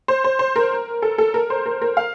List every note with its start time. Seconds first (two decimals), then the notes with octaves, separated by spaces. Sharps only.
0.08 C5
0.24 C5
0.39 C5
0.56 A#4
1.02 A4
1.18 A4
1.34 A#4
1.50 C5
1.66 A#4
1.82 A#4
1.97 F5